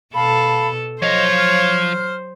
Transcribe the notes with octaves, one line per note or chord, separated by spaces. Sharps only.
B2 A4 F5 A5 B5
F3 F#3 C5 C#5 D#5 F5
F6